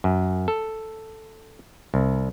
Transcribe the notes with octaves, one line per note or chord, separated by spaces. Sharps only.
F#2
A4
C2